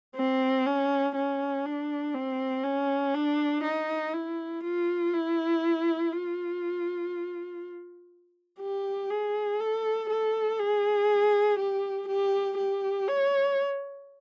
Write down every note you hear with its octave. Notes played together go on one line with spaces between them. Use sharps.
C4
C#4
C#4
D4
C4
C#4
D4
D#4
E4
F4
E4
F4
G4
G#4
A4
A4
G#4
G4
G4
G4
C#5